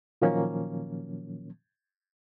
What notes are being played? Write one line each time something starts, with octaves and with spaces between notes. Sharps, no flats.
A#2 D#3 F3 F#3 A#3 C#4